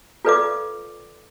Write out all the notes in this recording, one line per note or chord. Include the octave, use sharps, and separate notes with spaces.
F4 A4 B4 D5 F5 D6